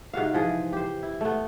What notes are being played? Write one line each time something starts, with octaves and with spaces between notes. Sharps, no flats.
G#2 C3 F#4 F5
E3 F3 G#4
G4 C5
E4
A3 B3